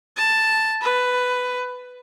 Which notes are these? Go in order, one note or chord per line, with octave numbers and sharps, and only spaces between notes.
A5
B4